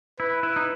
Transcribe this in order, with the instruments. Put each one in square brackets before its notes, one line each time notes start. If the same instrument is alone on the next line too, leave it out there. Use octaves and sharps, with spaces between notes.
[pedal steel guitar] E4 [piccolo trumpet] B4
[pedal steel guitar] E4
D#4